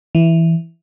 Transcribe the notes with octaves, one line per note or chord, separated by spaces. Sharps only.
E3